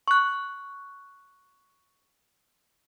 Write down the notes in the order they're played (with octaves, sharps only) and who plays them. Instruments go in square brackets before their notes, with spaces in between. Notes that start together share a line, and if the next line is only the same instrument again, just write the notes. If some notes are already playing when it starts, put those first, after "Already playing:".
[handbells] C#6 F#6